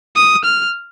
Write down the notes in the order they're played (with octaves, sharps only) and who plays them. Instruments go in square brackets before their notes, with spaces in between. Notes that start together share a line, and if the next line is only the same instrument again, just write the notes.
[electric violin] D#6
F6